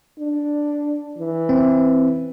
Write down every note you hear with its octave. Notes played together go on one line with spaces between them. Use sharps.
D4
E3
C4